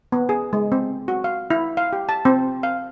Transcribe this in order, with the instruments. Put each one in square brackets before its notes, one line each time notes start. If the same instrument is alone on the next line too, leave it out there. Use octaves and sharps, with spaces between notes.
[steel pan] B3
G#4
G#3
C4
F#4
F5
E4
F5
G4
A5
C4
F5